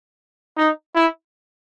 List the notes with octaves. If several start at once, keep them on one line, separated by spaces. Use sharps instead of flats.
D#4
E4